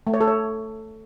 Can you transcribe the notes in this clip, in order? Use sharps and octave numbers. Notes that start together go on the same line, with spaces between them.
A3
C#5
A4
C#5